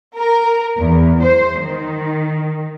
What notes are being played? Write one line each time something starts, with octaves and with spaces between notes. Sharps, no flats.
A#4
E2
C5
D#3